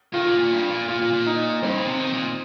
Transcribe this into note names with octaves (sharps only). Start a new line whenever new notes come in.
D#3 F4
A#2
A#2
G2
A#2
A#2 F4
A#2
A#2
D#4
G2 C4
A#2
C3
D#3
A#2